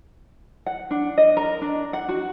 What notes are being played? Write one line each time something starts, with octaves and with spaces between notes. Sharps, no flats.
F#5
D4
D#5
A#4
D4
F#5
F#4